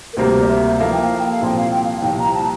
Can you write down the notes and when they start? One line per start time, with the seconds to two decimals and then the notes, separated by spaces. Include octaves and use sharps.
0.13 A#4
0.17 D2 C3 G3 A#3 C5
0.41 D5
0.48 E5
0.79 F3 A#3 E4 A4 F5
0.92 G5
1.05 F5
1.19 G5
1.32 F5
1.41 C2 A#2 F3 C4 G4 G5
1.58 F5
1.71 G5
1.84 F5
1.97 F5
2.03 C2 A#2 F3 G5
2.19 A#5
2.34 A5